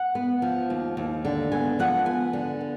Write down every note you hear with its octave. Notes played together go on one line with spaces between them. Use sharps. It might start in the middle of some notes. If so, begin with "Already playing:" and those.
Already playing: F#5
B3
F3
D#2
D#2
D3
B3 G#5
F3 F#5
B3 G#5
D3
B3